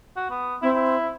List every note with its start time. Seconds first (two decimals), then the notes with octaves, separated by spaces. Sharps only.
0.16 F#4
0.30 B3
0.62 C4 E4
0.74 E4